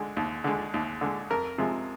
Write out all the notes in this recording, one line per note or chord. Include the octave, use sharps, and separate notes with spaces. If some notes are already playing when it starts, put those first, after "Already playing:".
Already playing: D3 G#3
D#2
D3 G#3
D#2
D3 G#3
F2 A#4
C3 F3 G#3